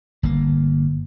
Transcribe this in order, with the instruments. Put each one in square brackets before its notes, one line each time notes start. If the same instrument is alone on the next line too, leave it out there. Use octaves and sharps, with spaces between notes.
[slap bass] G1 A#3